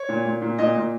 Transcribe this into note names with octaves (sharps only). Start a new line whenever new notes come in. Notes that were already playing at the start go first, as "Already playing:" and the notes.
Already playing: C#5
A#2
A#2
A#2
A#2 D#5
A#2